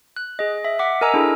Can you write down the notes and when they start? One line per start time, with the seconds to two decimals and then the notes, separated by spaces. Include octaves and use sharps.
0.16 F#6
0.39 G#4 D#5
0.65 E5
0.79 F#5 D6 B6
1.01 A#4 D#5 G#5 A#5 E6
1.14 D4 E4 G#4 A4